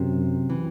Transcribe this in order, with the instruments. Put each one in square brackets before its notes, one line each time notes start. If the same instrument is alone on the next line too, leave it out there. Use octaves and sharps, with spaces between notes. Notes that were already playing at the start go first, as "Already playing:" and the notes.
Already playing: [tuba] F#2 [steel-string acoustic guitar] C3
[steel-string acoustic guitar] E3